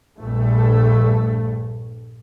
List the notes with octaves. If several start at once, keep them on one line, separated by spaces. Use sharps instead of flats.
A#1 G2 A3